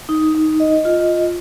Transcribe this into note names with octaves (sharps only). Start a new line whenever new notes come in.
D#4
D#4
D#5
F4
F4